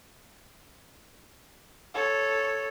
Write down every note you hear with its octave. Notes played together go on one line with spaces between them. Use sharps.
A4 C#5